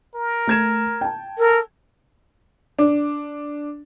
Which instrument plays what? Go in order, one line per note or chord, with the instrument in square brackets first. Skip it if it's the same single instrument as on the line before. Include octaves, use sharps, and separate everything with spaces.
[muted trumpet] A#4
[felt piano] A3 G#6 E7
G5 A5
[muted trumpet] A4 [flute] A#4
[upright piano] D4